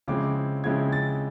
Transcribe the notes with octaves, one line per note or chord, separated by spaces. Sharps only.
C#3 F3 G#3 C4 E4 D6
C#3 F3 G#3 C4 E4 G#6
A6